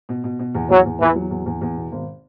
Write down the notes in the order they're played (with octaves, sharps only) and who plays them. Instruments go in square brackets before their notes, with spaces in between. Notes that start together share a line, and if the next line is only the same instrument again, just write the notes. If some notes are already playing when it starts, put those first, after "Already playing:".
[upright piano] B2
B2
B2
E2
[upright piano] E2 [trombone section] F#3
[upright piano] E2
[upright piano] E2 [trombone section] E3
[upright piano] F#3
E2
E2
E2
B2
G#1